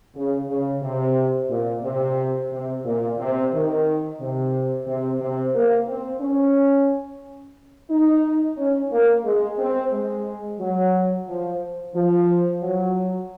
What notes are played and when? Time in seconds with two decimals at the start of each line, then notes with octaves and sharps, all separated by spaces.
0.15 C#3
0.49 C#3
0.83 C3
1.50 A#2
1.83 C3
2.51 C3
2.85 A#2
3.19 C3
3.52 D#3
4.19 C3
4.87 C3
5.21 C3
5.54 A#3
5.88 C4
6.21 C#4
7.90 D#4
8.57 C#4
8.92 A#3
9.25 G#3
9.58 C4
9.92 G#3
10.59 F#3
11.28 F3
11.95 F3
12.62 F#3